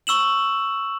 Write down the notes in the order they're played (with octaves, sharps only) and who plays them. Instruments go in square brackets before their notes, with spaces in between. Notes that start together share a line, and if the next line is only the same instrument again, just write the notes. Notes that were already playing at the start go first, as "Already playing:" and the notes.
[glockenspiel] C#6 E6 E7 F#7